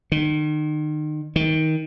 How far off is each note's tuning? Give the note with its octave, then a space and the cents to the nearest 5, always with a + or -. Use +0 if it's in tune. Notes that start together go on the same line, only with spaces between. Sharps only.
D#3 -35
D#3 +20